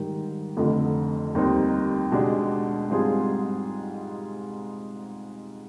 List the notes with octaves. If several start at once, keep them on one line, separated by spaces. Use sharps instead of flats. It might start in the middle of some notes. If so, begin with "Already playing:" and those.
Already playing: G#2 D#3 G3
F1 F2 D3
D#2 D#3 G3 C4 D#4
B2 G#3 D4 G4
G#2 G3 C4 F4 G#4